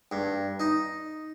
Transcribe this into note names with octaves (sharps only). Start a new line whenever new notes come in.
G2
D#4